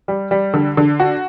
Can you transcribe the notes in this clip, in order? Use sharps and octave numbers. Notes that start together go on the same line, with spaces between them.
G3
G3
D3
D3
F#4